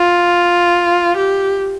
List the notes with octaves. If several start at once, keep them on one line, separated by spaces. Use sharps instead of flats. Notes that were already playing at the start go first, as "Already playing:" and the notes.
Already playing: F4
G4